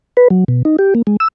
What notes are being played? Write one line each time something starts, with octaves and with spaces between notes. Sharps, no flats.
B4
F#3
B2
D#4
G4
A#3
G#3
E6